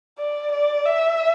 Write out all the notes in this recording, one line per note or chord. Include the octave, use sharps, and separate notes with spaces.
D5
D5
E5